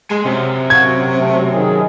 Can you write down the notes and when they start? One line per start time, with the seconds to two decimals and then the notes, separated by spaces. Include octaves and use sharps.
0.11 G#3 G#5 C6
0.25 F#2 C3
0.70 F#4 G#6
1.17 A3
1.51 D#3 G#4